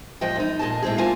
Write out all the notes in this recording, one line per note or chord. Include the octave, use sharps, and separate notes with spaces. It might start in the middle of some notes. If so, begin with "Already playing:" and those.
A#2 F3 D#5 G5
F#2 D#4
A#2 G#4 D#5 A5
A2 C4 G#4
A#3 F4 G#5 A5